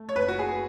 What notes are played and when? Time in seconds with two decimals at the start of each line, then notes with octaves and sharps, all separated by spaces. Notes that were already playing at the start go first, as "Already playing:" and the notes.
Already playing: A3
0.09 C#5
0.15 F#1 B4
0.28 F#4
0.39 G#4